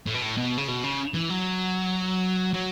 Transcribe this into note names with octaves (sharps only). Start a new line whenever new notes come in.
A2
B2
A2
B2
C#3
B2
C#3
E3
F#3
F#3